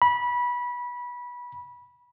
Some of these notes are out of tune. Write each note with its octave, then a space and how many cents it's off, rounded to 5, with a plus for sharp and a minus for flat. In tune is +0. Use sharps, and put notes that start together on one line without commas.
B5 -20